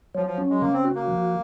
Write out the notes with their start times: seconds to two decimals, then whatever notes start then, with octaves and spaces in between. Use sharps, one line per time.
0.15 F3 F#3
0.26 F3
0.38 C#4
0.50 G#3
0.61 C#3 A#3
0.73 C4
0.84 F#4
0.95 A#3
1.07 F3